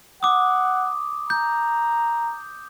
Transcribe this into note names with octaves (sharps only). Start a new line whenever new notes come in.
F#5 D6 D#6
A#5 G6